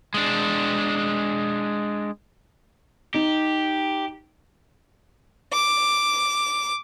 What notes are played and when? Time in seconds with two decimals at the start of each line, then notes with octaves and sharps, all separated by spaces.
0.14 G#3 D4
3.14 D#4 G4
5.53 D6